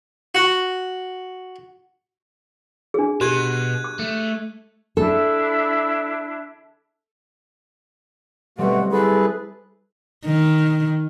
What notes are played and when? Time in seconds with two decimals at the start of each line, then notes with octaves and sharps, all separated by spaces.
0.35 F#4
2.94 D4 G#4
3.21 B2 G4 F#6 G#6 D#7
3.84 D6
3.99 A3
4.97 D4 E4 A4 E5
8.58 B2 G3 A3 C4 F#4 F#5
8.92 E4 G#4 A4 B4
10.26 D#3